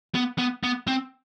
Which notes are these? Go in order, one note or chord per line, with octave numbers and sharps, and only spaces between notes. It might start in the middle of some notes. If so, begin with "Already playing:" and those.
B3
B3
B3
C4